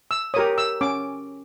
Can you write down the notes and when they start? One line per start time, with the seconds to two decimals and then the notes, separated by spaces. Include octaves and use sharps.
0.11 E6
0.34 G4 A#4 C#5 D#6
0.58 E6
0.81 C#4 D6